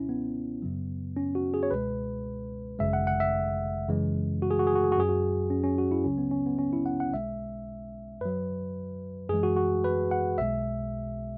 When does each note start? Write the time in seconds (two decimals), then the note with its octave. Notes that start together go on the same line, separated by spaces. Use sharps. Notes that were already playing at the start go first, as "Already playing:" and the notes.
Already playing: C#2 B2 F#3 C#4 E4
0.09 B3
0.62 F#2 C#3 F#3
1.16 C#4
1.35 F#4
1.54 G#4
1.63 C#5
1.71 C#2 B2 G#3 B4
2.79 G#1 F#2 C#3 G#3 E5
2.93 F#5
3.07 F#5
3.20 E5
3.88 F#2 C#3 E3 G#3
4.42 F#4
4.51 G#4
4.59 F#4
4.67 G#4
4.76 F#4
4.84 G#4
4.92 F#4
4.97 F#2 F#3 G#4
5.09 F#4
5.50 C#4
5.64 C#4
5.78 F#4
5.91 E4
6.04 C#2 C#3 F#3 C#4
6.18 B3
6.31 C#4
6.46 B3
6.59 C#4
6.73 E4
6.86 F#5
7.00 F#5
7.13 B1 B2 G#3 E5
8.21 F#2 F#3 B4
9.29 F#2 E3 G#3 G#4
9.43 F#4
9.56 F#4
9.84 B4
10.11 F#5
10.38 B1 B2 G#3 E5